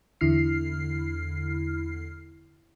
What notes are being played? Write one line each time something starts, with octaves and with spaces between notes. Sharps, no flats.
E2 D3 E4 F6 C7